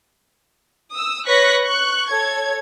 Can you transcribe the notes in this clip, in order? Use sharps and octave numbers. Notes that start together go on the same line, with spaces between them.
D#6 E6
B4 C#5 C#6 F#6 A#6 B6
C#6 F#6
A4 C#5 G#6